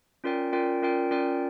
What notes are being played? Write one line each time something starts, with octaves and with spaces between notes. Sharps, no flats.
C#4 F4 A#4 D5 G5
C#4 F4 A#4 D5 G5
C#4 F4 A#4 D5 G5
C#4 F4 A#4 D5 G5